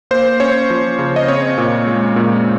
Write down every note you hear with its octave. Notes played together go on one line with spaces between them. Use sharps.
A#3 C5
C#4 C#5
F3
C#3
D#5
C4 C#5
A#2
G#3
A#2